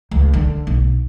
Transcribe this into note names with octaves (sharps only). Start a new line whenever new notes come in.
C#2
D3
B1